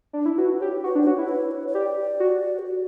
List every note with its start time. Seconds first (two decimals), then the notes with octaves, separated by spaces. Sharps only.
0.13 D4
0.26 E4
0.38 F#4 B4
0.60 G4 C#5
0.84 F#4 B4
0.95 D4
1.02 B4
1.07 F#4 C#5
1.18 E4
1.29 B4
1.51 C#5
1.68 C#5
1.74 G4 D5
2.20 F#4
2.59 G4
2.65 F#4